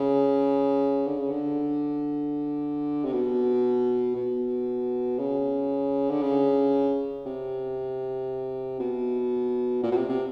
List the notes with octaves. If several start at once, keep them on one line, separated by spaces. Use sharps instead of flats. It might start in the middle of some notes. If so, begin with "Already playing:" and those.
Already playing: C#3
D3
C#3
D3
C3
B2
B2
C#3
D3
C#3
C3
B2
A#2
B2
C3
C3